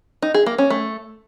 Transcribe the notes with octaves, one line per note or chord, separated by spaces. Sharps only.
D#4
G#4
A#3
C#4
A3